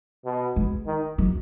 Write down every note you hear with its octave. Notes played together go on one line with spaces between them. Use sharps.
B2
G#3
D#3
F#3